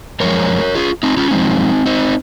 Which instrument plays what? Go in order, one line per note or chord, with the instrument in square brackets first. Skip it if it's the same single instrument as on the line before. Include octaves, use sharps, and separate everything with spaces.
[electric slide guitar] F#2 F3 G#3 A#4 C#5
F4 G#4
C4 D#4
C#4 F4
F#2 F3 G#3 C4 D#4
C4 D#4